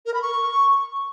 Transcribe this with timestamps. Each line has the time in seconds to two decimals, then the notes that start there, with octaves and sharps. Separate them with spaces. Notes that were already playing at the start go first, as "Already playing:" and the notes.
0.06 A#4
0.14 B5
0.22 C#6